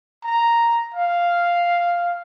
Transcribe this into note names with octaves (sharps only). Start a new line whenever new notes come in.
A#5
F5